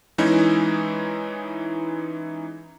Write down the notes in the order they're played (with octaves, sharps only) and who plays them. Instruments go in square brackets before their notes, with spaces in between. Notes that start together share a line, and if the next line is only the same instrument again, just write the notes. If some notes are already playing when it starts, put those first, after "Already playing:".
[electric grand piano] E3 G#3 C#4 D#4 E4